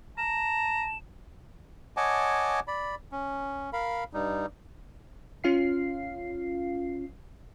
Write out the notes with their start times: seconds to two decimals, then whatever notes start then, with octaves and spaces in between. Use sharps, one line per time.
0.18 A5 A#5 E7
1.97 C#5 D#5 F#5 G#5 A5 D6
2.68 D5 B5
3.12 C#4
3.73 A#4 F5 B5
4.13 G2 G3 D#4
5.44 C#4 F4 F5 C7